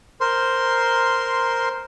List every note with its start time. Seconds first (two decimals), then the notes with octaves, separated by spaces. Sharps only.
0.21 A#4 C5 C6